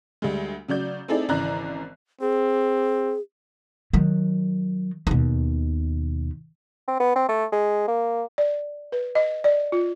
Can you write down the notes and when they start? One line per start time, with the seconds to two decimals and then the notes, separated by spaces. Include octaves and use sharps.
0.22 D2 G3 G#3
0.68 C#3 F#3 D5 G6
1.08 C4 D#4 E4 G#4 A4 D5
1.29 G#1 C#3 E3 D5 A#5 F#6
2.21 C4 G#4
3.93 D#3 F#3
5.07 D#2 B2
6.88 C4
7.00 B3
7.15 C4
7.29 A3
7.52 G#3
7.88 A#3
8.38 D5
8.92 B4
9.15 D#5
9.44 D5
9.72 F4